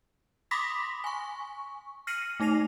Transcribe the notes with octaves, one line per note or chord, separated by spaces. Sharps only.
B5 C6 D6 D#6 A#6 B6
G#5 C#6
F6 A#6 C7 C#7 D#7 F#7
A3 D#4 A#6 C7 F7